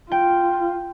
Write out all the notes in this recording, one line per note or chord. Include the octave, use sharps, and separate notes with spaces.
F4 G5